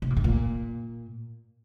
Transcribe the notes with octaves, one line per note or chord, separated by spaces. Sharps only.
C3
A#2
G#2
A#2